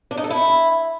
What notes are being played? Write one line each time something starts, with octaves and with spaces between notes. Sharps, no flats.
D4
D#4
A4
E4